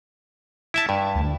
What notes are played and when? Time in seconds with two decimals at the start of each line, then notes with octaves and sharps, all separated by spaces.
0.74 E4 E5 A5
0.89 G2
1.15 D2